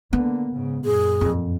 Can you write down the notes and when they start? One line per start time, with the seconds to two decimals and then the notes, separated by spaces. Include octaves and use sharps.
0.13 D3 A#3 B3
0.52 G#2 C#3
0.85 F#2 A#2 G#4
1.21 F2